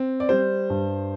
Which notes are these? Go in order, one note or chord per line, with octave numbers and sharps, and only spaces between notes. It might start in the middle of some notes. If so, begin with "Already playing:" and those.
Already playing: C4
D5
G3 C5
G2